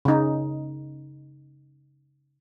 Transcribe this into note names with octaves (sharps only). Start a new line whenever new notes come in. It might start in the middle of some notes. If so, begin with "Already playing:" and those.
C#3 D#4